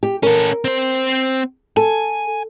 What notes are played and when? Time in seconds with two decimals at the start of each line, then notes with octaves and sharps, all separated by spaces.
0.03 G4
0.23 C#4 A4 A#4
0.65 C4 C5
1.77 A4 G#5